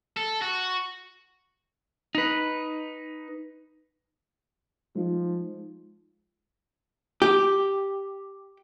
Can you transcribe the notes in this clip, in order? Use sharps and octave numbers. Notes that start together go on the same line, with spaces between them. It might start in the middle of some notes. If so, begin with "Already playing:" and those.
A4
F#4
D#4 B4
F3 G#3 D#4 F4
G4